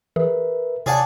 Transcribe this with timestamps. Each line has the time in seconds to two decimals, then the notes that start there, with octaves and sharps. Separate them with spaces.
0.16 E3 G#4 A#4 B4 E5
0.86 C3 G#4 C#5 D5 F#5 G#5 A5